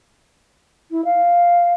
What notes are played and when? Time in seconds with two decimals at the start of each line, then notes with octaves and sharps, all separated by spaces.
0.91 E4
1.05 F5